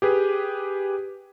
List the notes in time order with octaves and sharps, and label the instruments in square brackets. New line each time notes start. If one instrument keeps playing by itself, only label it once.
[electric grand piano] G4 G#4 B4